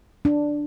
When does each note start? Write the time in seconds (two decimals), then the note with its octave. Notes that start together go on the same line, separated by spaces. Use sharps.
0.25 D4